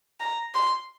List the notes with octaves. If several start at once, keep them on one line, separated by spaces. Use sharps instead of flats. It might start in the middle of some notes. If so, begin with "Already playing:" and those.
A#5
C6